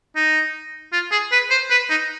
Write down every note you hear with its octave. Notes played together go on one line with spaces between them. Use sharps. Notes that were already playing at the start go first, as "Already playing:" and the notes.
D#4
F4
G#4
B4
C5
B4
D#4